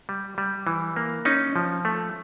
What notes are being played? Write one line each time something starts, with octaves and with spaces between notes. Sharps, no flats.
G3
G3
E3
A#3
C#4 D#4
F3
A3